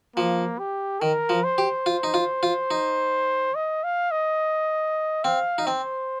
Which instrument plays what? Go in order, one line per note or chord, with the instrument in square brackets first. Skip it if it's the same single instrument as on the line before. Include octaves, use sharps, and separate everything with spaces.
[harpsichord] F3 [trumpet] A#3
[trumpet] G4
[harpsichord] D#3 [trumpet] A#4
[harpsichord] F3
[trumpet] C5
[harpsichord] G4
F4
D#4
F4
F4
D#4
[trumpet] D#5
F5
D#5
[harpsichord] C4 [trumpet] F5
[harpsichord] D#4
[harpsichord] C4 [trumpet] C5